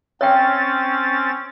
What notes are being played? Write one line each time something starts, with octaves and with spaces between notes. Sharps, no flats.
C4 C#4 C#5 G5 A6